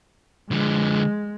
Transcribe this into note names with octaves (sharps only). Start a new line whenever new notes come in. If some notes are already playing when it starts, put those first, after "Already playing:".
D3 F3 G#3